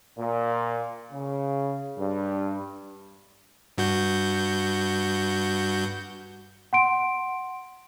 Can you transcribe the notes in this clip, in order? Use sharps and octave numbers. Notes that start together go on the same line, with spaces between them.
A#2
C#3
G2
G2 F#4 G6
F#5 C6 D7